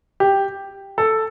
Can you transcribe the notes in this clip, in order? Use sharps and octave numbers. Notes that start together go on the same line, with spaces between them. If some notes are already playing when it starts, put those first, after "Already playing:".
G4
A4